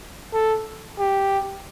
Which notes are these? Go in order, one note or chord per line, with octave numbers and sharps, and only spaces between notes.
A4
G4